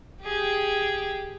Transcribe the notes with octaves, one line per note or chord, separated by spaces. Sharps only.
G4 G#4